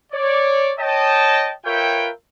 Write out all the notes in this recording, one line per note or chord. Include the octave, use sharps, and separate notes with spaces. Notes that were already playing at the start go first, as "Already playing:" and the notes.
C#5 D5
C#5 D#5 G5 A5
F4 A#4 B4 C#5 E5 G5